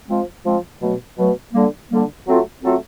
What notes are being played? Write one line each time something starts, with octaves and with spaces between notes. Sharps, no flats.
F3 G#3 C4
F3 G#3 C4
B2 F#3 A3
B2 F#3 A3
D3 G3 A#3
D3 G3 A#3
F#3 A3 C4 F4 A4
F#3 A3 C4 F4 A4